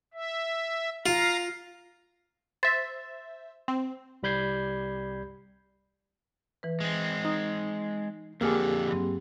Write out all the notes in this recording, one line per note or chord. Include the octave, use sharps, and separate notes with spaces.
E5
F4 F5 A#5
C5 E5 A6
C4
C2 G3 B5 G6 G#6 C7
E3 B4
G#3 C4
D#4 D#6
F2 D3 A#3 G4 G#4 D6 E6 F6
G2 F#3 C4